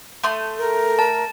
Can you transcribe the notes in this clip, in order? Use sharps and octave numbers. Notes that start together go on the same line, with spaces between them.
A3 C6 D#6
A4 A#4
A5